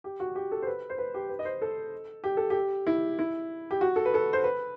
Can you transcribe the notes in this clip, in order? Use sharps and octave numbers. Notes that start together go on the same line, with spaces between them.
G4
F#4
G4
A4
C5
B4
C5
B4
G4
B4
D#5
C5
A4
G4
A4
G4
E4
E4
G4
F#4
A4
B4
A4
C5
B4